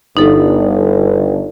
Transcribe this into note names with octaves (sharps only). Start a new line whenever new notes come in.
G1 D#4 A4